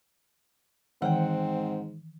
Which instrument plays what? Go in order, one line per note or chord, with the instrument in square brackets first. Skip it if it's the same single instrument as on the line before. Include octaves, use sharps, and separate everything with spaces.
[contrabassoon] G#2 [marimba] D#3 E3 [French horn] C4 [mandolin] F#5 G5